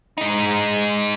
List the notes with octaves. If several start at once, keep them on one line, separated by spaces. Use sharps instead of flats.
G#3 D#4